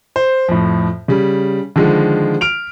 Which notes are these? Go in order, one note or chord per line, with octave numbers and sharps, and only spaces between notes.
C5
F2 A2
C#3 G3
D3 D#3 F3 G#3
F6 D7 F7